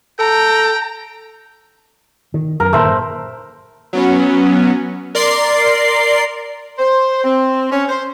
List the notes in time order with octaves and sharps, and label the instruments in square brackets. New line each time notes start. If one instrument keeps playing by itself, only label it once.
[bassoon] A4 [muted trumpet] G5 [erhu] A#5
[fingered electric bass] D#3
[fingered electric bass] F#2 [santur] A#4
[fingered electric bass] G1 A#2 D#3 [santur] A3 C5 B5
[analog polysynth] F#3 B3 C#4
A#4 D5 C6 C7
[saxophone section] C5
C4
C#4
C5